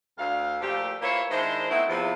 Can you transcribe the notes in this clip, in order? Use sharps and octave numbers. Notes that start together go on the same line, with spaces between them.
D2 F5
A#2 F3 A3 G4
E3 A#3 E4 F4 C5 C#5
D#3 G#3 D4 E4 C5
A3 B3 C4 D#4 E4
E2 C3 F3